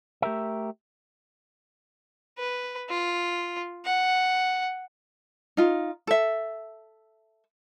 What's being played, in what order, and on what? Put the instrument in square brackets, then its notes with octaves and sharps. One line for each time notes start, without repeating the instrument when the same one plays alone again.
[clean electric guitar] A3 G4 A#4 E5
[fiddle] B4
F4
F#5
[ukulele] D#4 F4
A4 E5